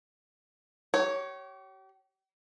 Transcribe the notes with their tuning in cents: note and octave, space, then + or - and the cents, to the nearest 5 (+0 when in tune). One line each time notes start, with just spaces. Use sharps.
G4 -40 C#5 +0